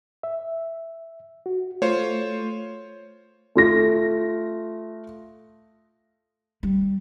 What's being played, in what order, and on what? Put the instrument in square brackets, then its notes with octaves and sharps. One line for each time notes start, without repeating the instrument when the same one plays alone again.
[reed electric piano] E5
F#4
[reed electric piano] A3 [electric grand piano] F4 C5 C#5
[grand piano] A3 F4 A#6
[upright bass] G3